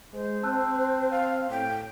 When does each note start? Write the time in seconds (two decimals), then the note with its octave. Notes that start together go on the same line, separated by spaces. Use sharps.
0.13 G#3 C5
0.43 C4 A5 E6 F#6
1.10 F5
1.50 A2 G5